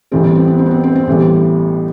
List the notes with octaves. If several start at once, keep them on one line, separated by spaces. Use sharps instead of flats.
A1 A2 E3 G3 C4
B3
C4
B3
C4
B3
C4
C4
C4
A1 A2 E3 G3 B3